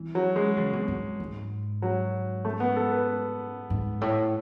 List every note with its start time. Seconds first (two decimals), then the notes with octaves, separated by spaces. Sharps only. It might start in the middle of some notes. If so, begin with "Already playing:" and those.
Already playing: E3
0.15 F#3
0.36 G#3
0.57 C#3
0.73 B2
0.88 G#2
1.20 G#2
1.82 F#3
2.45 A3
2.60 B3
2.76 A4
2.92 B4
3.70 G#2
4.01 A2